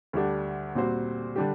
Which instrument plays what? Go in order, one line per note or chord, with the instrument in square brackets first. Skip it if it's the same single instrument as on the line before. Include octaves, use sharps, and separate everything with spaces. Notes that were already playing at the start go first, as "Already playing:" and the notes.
[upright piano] D2 D3 G3 D4 G4
A#2 G3 C4 F#4 C5
D3 G3 D4 G4